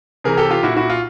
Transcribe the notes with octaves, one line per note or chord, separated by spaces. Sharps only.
C3 E3 G#4 A#4
G4 A4
F4 G4
A#2 E4 F#4
E4 F#4
F4